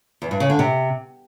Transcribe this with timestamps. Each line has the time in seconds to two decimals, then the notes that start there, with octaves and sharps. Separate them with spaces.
0.22 E2
0.31 G2
0.40 C#3
0.50 D3
0.59 C3